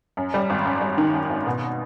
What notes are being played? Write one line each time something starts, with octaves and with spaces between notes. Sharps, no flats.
F#2
G3
G#1
F#2
G3
D#3
F#2
G#1
B2